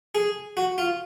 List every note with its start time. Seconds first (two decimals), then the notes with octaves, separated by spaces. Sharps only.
0.15 G#4
0.57 F#4
0.78 F4